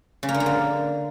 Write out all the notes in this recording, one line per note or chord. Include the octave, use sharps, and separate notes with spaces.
C#3
A#3
D3
A#3
D3